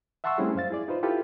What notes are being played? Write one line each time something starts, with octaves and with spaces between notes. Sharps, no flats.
E5 F#5 A5 C6 C#6 E6
G3 A3 C4 C#4 E4 G#4
F#2 C5 F5 A6
E4 G#4 D5
D#4 F4 B4 C5
E4 F4 G4 A4 B4